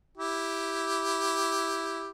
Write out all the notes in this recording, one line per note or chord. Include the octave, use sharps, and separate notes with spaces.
E4 G4